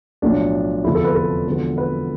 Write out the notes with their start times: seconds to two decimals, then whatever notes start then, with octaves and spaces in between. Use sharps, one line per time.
0.22 B1 A2 F3 D4
0.84 F1 E2 D3 F3 E4
0.95 A4
1.04 B4
1.15 A4
1.46 E1 E2 D3 F3
1.78 B4